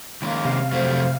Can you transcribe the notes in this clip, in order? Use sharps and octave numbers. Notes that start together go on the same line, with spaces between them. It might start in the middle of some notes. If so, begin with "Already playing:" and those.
D#3 G#3 A#3 C#4
C3 F5
F2 F#3 A3 C5